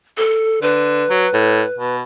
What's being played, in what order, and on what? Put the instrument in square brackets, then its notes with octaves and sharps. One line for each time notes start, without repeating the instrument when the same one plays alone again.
[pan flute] A4
[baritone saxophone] D3 [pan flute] B4
[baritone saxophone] F#3
A2
B2